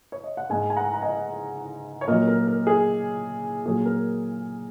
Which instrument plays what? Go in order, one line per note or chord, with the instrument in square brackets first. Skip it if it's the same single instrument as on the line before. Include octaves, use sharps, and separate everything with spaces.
[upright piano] C#5
D#5
F#5
G#2 G#3 D#5 G#5
G#5
F#5 A#5
A#5
D#5 G#5
C#5
A#2 F#3 A#4 D#5
A#4
A#4
G#4
A#2 F#3 G#4
A#4